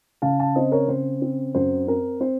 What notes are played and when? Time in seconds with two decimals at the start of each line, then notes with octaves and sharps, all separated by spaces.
0.22 C#3 F5 A5
0.39 F5 A5
0.55 C4 C5 D#5
0.71 A#4 C#5
0.88 C#3 C5
1.22 C4
1.55 F#2 C5
1.87 C4 A#4
2.20 C4 C5